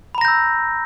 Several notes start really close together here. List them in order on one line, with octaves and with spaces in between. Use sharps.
B5 A#5 A#6 G6 E6